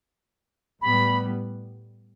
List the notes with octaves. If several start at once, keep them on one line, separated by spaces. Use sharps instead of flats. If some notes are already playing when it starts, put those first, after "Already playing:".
A2 G3 B3 B5